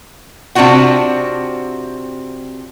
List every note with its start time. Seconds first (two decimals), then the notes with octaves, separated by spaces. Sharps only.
0.55 C3 C4 D4 F4 F#4 F#5